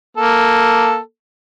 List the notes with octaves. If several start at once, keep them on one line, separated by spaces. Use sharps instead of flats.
A#3 A4